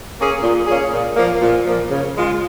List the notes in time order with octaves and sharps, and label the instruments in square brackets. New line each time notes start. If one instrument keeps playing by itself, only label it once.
[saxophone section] A#3 C#4 G#4
A#2
A#3 C#4 G#4
A#2
F3 A#3
A#2
F3 A#3
C#3
G#3 F4